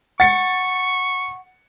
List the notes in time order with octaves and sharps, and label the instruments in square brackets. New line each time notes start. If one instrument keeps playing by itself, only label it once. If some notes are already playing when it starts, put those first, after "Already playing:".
[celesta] F#5 [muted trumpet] C#6 [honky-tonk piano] A6 C#7